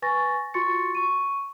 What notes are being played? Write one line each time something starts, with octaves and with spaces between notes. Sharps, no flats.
B4 G#5 C#6 A6 A#6
F4 F#4 C6 C#6 A6 C#7
C#6 D#7